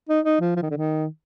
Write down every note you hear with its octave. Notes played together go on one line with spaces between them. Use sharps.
D#4
D#4
F3
F3
D#3
D3
D#3